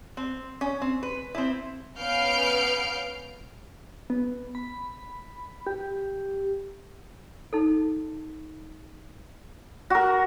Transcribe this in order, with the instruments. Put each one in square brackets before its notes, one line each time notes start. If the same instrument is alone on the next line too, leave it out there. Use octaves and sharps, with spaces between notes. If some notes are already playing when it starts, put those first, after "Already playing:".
[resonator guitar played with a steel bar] C4
C#4
C4
B4
C4 E4
[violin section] B3 C#4 F5 F6 G6 D7
[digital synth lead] B3
B5
G4
[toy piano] D#4 A4
[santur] F#4 A#4